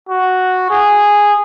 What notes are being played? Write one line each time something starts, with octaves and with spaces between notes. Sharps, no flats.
F#4
G#4